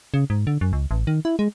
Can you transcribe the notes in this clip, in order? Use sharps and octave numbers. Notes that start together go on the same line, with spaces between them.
C#3
G#2
D3
F#2
C#2
A1
D#3
E4
G#3